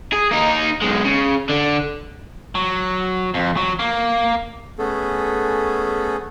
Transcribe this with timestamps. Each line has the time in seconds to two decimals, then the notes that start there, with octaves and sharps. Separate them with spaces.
0.13 G#4
0.31 A#3 D#4
0.81 B1 G#3
1.05 C#3
1.50 D3
2.55 F#3
3.34 F2
3.57 F#3
3.79 A#3
4.79 A3 B3 C#4 G#4 A4